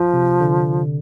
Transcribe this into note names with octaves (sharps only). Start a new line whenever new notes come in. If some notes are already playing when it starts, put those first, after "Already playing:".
Already playing: F3
C3
D3